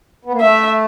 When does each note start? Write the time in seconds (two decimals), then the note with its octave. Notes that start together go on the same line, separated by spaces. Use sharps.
0.25 B3
0.33 A#3
0.40 A3 E5